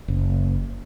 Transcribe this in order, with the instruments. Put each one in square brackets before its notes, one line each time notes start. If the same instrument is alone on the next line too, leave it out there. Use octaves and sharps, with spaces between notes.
[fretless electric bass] F#1